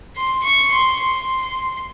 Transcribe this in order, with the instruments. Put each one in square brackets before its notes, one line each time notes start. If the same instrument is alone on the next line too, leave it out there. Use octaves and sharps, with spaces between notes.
[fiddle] C6
C#6
C6
C6
C6